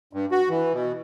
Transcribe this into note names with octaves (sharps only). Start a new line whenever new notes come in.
G2
F#4
E3
B2